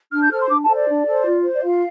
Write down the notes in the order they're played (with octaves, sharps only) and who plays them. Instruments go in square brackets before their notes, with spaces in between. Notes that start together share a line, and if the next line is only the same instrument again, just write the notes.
[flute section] D4 F6
G6
A4 C5 F6
C6
D4 D6
A5
A4 C5
D5
D4
A4 C5
F4
C5
D5
F4 F5